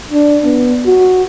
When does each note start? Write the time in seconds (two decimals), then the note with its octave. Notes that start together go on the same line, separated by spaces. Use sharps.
0.11 D4
0.45 B3
0.86 F#4